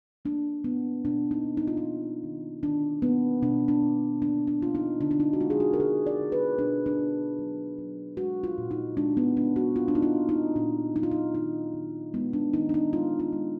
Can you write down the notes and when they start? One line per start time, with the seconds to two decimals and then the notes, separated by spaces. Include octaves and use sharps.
0.25 A#3 D4
0.64 B2 B3
1.05 B2 D4
1.31 D#4
1.44 A#3
1.57 D#4
1.67 F4
1.77 D#4
1.83 A#3
2.24 D#3
2.63 D#3 D4
3.02 A#3 B3
3.42 B2 D4
3.68 D4
3.82 B2
4.22 A#3 D4
4.47 D4
4.61 A#3 F4
4.75 D#4
5.01 D3 D4
5.11 D4
5.20 D#4
5.33 F#4
5.40 G#3 F4
5.50 G#4
5.60 F#4
5.73 A#4
5.80 D3 G#4
6.06 D5
6.20 D3
6.32 B4
6.59 B2 D4
6.86 D4
6.99 B3
7.39 F#3
7.78 F#3
8.17 G#3 F#4
8.44 F4
8.58 A#2
8.71 D#4
8.97 G#3 D4
9.17 B3
9.36 G#3 D4
9.56 F#4
9.76 A#3 F4
9.88 D4
9.95 D#4
10.02 F4
10.16 A#3
10.29 D#4
10.56 A#2 D4
10.95 F#3 D#4
11.03 F4
11.11 D#4
11.35 D#3 D#4
11.74 D#3
12.14 G#3 B3
12.33 D4
12.53 D#3 D#4
12.69 D4
12.74 D#4
12.93 G#3 F4
13.20 F4
13.33 G#3